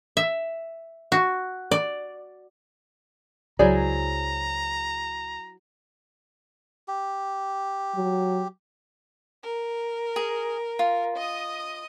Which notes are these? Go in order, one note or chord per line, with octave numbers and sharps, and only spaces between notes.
E5
F#4
D5
C#2 F#3 E4 G#4 C5 D5 A#5
G4
F#3
A#4
G#4
F4
D#5 D#6